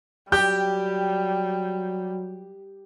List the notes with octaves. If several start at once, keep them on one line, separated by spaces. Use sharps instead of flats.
F#3 G3 G4 G6